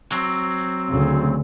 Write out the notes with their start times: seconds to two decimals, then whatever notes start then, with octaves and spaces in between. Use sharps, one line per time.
0.12 F#3 C4
0.88 D2 C#3